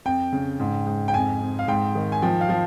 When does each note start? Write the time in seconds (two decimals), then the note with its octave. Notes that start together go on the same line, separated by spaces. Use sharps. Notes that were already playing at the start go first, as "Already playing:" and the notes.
0.05 F2 G5
0.33 C#3
0.60 G#2
0.87 G#2
1.08 G5
1.14 F2 G#5
1.41 F2
1.59 F5
1.68 G#2 G5
1.95 D#3
2.12 G#5
2.22 F3 G5
2.41 F5
2.49 F3